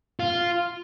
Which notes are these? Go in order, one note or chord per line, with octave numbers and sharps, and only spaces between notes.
F4